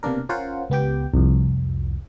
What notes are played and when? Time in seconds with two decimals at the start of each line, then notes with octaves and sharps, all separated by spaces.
0.03 C3 A#3 B3 D4 A#4
0.29 C#4 F4 A#4 C5 F#5
0.70 C#2 B3 G4 G5
1.14 C2 F2